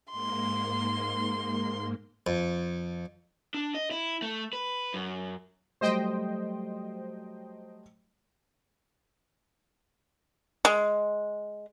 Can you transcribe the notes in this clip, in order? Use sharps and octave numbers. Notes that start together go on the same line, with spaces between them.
G#2 A#3 C6
F2
D4
D#5
E4
A3
B4
F#2
F#3 G3 A3 C5 D#5 G5
G#3